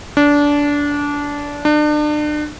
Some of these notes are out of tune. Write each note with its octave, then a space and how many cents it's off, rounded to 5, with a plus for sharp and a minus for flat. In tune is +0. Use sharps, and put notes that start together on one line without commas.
D4 -20
D4 +35